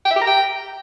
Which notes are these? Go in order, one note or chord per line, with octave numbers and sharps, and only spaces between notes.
G5
E5
G4
A#5
G5